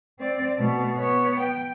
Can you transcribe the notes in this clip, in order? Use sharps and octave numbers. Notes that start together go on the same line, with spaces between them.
C4 D5
B2 A3
B3 C#5
G5